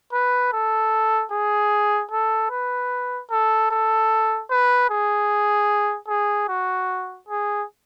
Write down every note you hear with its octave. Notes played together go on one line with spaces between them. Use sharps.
B4
A4
G#4
A4
B4
A4
A4
B4
G#4
G#4
F#4
G#4